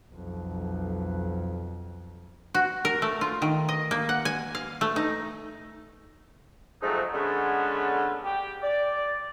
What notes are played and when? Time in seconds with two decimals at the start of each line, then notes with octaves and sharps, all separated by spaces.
0.11 B1 F2
2.54 F#4
2.85 A#4
3.02 A3
3.21 F4
3.42 D#3
3.69 D#5
3.91 A#3
4.09 F#5
4.25 G#5
4.55 F5
4.81 A3
4.96 D#4
6.81 F2 G#2 F#3 A3 D#4
7.12 D3 G#3 A3 B3 C#4
8.23 G4
8.62 D5